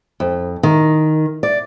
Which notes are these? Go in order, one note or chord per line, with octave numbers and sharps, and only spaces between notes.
F2
D#3
D5